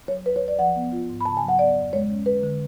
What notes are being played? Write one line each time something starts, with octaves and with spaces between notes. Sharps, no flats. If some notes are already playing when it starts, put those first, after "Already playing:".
F#3 C#5
D2 B4
C#5
D2
D5
F3 F#5
B3
F4
G#2
B5
C#3 A5
G#5
F#3
F#5
B3 D5
F2
G#3 C#5
C#4
D3 B4
D3